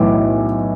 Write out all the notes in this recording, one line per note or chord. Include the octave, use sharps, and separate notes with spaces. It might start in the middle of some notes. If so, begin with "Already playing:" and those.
Already playing: B1 A2 E3 D6